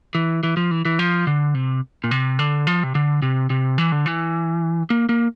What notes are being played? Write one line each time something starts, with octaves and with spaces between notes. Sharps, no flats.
E3
E3
F3
E3
E3
F3
D3
C3
A#2
C3
D3
F3
C3
D3
C3
C3
E3
D3
E3
A#3
A#3